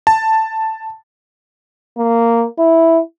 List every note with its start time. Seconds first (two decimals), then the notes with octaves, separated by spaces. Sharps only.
0.07 A5
1.98 A#3
2.59 E4